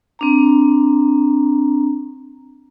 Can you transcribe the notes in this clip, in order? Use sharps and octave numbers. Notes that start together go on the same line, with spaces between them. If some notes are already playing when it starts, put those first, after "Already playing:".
C4 D4 A#5